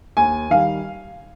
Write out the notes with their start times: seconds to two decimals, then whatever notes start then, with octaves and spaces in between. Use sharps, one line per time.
0.17 D#2 G#5
0.50 D#3 G3 F5